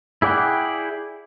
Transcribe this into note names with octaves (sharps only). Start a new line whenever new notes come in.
E4 G#4 D5 F#5 G5